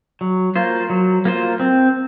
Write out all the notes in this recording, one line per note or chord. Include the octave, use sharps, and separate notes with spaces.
F#3
A#3 F4 C5
F#3
A#3 F4 C5
C4